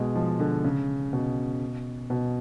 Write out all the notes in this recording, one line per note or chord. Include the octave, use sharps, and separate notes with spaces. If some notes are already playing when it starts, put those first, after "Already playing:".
Already playing: B2 G#3
F3
D3
C#3
B2
B2